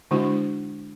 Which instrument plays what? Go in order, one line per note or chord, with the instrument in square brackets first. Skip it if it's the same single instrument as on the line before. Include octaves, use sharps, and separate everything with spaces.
[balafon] D3 G#3 D4 E4 F#4